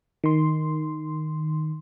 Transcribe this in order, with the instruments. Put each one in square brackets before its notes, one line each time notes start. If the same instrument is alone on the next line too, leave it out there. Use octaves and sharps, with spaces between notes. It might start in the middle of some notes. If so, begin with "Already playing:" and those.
[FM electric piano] D#3 C6